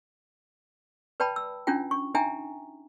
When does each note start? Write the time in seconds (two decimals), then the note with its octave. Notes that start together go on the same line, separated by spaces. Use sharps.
1.20 B4 D5 G5 A5 B5
1.36 E6
1.67 C#4 D4 E4 F4 G5
1.91 C#6
2.14 D4 D#4 E5 G5 G#5 A#5